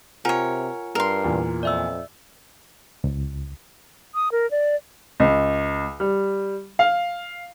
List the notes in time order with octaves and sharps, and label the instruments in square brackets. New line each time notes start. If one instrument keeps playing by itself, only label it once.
[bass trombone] C3 [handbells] F4 F#5 G#5 [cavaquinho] A#4 C#5
[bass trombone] G2 [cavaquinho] A#4 C6
[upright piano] E2 A#2
[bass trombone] F2 [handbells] D5 E5 E6
[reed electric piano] C#2
[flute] D#6
A#4
D5
[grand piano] C#2
G3
F5